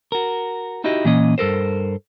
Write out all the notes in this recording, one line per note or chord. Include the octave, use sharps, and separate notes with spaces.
F#4 A#4
D#4 E4 F#4 G4 D#5
A#2 E3 A#3 C#4 D#5
G2 A4 A#4 C5